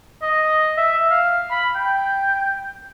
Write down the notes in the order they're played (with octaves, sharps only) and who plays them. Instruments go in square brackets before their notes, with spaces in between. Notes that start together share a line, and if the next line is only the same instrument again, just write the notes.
[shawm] D#5
E5
F5
B5
G5